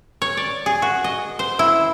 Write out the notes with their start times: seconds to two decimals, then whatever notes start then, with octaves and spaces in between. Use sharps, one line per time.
0.22 C#5
0.37 D5
0.66 G#4
0.82 F#4
1.04 D#5
1.39 C5
1.59 E4